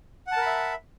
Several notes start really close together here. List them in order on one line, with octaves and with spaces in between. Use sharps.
F#5 A5 A#4 B5 E5